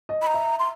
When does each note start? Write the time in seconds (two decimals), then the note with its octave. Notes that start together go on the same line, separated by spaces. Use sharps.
0.09 D#5
0.22 B5
0.27 A#5
0.34 E5
0.59 C6